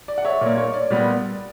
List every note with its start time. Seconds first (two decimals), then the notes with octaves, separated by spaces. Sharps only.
0.08 D5
0.18 F#5
0.25 C#5 E5
0.41 A#2 A#3 D5
0.58 C#5
0.74 D5
0.90 A#2 G3 B3